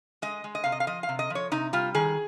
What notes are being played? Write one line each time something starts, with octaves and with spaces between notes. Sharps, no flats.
G#3 D#5
G#3
D#5
C3 F5
D#5
F5
F3 D#5
F5
C3
D#5
F3
C#5
C3 D#4
G3 F4
D#3 G#4